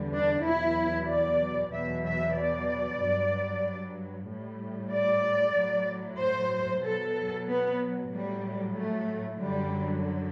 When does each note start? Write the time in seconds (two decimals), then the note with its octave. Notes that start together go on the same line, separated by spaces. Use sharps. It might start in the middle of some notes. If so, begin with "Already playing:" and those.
Already playing: E2 D3 G3
0.15 D4
0.46 E2 B2 F#3 E4
1.09 D5
1.73 E2 B2 F#3 E5
2.06 E5
2.38 D5
3.02 G2 F#3
4.29 A2 G3
4.93 D5
5.57 A2 F#3
6.21 C5
6.85 B2 F#3 A4
7.49 B3
8.13 A2 F#3 G3
8.76 A3
9.40 F#2 D3 F#3 G3